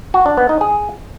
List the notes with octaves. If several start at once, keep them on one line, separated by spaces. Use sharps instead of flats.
F#4
D4
B3
D#4
G#4